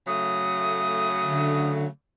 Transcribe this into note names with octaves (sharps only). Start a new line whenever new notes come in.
C#3 F#3 A3 D#6
D3